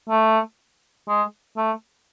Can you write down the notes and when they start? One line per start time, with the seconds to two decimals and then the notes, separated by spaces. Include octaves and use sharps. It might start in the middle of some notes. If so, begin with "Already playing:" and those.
0.10 A3
1.08 G#3
1.57 A3